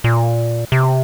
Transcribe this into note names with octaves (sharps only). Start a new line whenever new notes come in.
A#2
C3